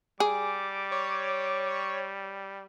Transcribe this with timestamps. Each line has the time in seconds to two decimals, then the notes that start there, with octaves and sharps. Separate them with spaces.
0.20 G3 G#4 D6
0.92 C#5